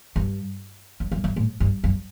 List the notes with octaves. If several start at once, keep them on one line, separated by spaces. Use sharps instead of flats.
G2
F#2
F#2
G2
A2
G2
F#2